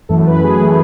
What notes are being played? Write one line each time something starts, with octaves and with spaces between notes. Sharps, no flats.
F#2 E3 A3 A4
B4
G#4
E3 A3